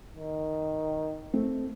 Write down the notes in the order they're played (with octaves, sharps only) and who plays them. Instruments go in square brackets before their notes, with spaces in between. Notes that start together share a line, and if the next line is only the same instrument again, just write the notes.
[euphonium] D#3
[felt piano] A3 C4